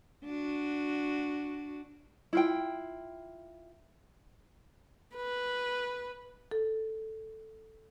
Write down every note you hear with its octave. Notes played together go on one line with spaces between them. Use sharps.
D4 F#4
E4 F4 G5
B4
A4